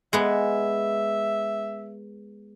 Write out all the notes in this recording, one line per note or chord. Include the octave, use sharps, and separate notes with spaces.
G#3 B3 E5